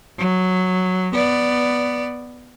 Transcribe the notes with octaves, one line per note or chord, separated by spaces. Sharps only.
F#3
B3 D5